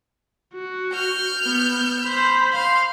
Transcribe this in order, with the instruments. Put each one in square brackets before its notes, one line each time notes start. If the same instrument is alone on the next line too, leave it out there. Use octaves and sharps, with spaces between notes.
[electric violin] F#4
[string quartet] F6 G6
[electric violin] B3
C5 B5
[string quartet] F5 C6